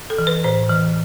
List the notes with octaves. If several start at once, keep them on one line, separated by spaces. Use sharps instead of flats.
A4
E3
B4
A2 C5
E3